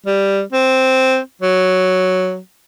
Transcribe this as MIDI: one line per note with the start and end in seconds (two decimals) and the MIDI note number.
0.06 0.41 55
0.53 1.19 60
1.42 2.38 54